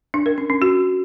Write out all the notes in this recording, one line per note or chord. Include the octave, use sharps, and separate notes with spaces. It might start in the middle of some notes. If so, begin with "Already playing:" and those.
D4
A#4
C#4
C#4
F#4